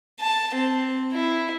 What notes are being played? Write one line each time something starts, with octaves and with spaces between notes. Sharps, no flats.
A5
C4
E4